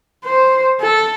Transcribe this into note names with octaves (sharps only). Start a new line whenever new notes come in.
C5
A4